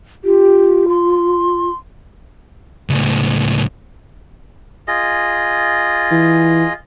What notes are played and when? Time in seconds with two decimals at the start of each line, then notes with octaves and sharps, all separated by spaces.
0.24 F4 G4
0.89 C6
2.90 C#2 A2
4.88 F4 G#4 D#5
6.11 E3